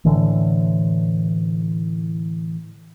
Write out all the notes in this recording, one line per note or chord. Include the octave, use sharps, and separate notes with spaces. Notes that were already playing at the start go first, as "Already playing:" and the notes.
A2 D3 E3